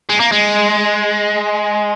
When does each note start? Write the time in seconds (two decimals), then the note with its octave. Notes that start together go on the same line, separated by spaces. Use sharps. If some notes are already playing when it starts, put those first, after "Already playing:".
0.10 G#3
0.20 A#3
0.32 G#3